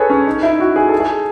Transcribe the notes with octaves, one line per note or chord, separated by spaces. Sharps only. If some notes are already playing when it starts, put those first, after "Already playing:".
Already playing: G#4 A4 B4 C#5
C#4
D#4
E4
F#4
G#4
A4
G#4